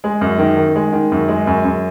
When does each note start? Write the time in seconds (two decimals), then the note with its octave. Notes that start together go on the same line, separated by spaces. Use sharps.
0.04 G#3
0.21 F#2
0.39 D#3
0.57 D#3
0.76 G#3
0.93 D#3
1.12 F#2
1.28 G#3
1.47 F#2
1.65 F#2